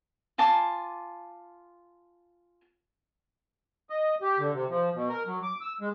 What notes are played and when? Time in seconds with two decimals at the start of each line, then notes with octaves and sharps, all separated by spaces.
0.38 F4 G#5 A5 D6
3.90 D#5
4.22 G4
4.39 D3
4.54 C3
4.69 F3
4.94 B2
5.09 A#4
5.26 F#3
5.43 D6
5.61 E6
5.81 G#3